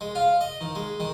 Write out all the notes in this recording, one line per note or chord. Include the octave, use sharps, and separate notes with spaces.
G#3
F4
D#5
D#3
G#3
D#3